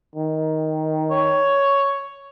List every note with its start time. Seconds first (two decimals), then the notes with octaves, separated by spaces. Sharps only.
0.16 D#3
1.11 C#5